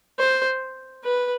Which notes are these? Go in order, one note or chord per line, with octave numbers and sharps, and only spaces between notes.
C5
B4